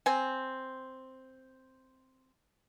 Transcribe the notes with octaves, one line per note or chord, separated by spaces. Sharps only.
C4 G#5